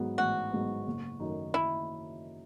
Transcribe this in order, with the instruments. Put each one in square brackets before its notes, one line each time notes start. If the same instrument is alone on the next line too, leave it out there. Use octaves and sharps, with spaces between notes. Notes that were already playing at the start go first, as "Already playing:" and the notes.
Already playing: [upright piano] G#2 F#3 B3
[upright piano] A1 [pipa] F#4
[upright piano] G#2 F#3 B3
F#1
F#2 D#3 A3 D#4
[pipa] E4